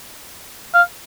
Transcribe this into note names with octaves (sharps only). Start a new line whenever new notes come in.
F5